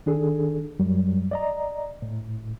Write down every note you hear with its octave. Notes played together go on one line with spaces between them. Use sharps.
D#3 D4 G#4 A4
F#2 F#3 G3
D5 D#5 A#5
A2